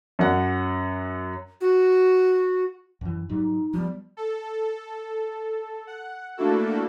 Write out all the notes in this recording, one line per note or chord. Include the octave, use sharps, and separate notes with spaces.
F#2 F#5
F#4
F#2 E3
G#2 F#3 G3 D#4
F3 G3 B3
A4
F#5
A3 A#3 D4 E4 F#4 A4